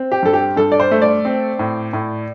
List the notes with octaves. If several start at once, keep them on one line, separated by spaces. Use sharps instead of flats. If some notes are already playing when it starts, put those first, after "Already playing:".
Already playing: C4
G4
G2 A4
G4
G2 A4
D5
C5
A3
D5
C4
A2
A2